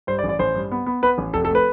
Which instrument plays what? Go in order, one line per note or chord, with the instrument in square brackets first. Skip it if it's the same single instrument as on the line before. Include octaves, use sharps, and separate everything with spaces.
[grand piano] G2 C5
D5
A1
D5
A1 C5
G2
B3
B3
B3 B4
A1
F1 A4
A4
A3
B4